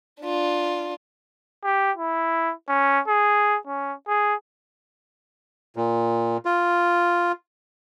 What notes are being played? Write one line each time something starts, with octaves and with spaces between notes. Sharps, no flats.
D4 F4
G4
E4
C#4
G#4
C#4
G#4
A#2
F4